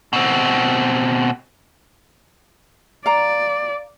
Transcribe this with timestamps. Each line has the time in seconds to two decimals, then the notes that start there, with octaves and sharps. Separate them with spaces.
0.13 B2 C4
3.06 D5 F5 A#5